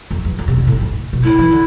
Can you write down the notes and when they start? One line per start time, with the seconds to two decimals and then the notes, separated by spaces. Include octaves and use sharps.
0.11 F2
0.25 E2
0.39 F2
0.48 C3
0.58 B2
0.67 A2
0.81 G#2
1.13 B2
1.23 A2 E4
1.39 E3
1.50 D3